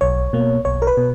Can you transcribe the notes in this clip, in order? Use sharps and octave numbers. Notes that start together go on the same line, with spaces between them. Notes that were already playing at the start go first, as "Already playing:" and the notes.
B1 C#5
B2 A#3
B1 C#5
A#4
B4
B2